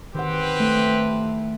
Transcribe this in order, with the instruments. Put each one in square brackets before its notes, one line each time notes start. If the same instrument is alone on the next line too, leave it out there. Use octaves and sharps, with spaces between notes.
[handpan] D#3 F#5 [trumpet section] C4 G4 B4
[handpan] A3